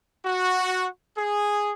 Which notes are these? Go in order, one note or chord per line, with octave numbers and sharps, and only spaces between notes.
F#4
G#4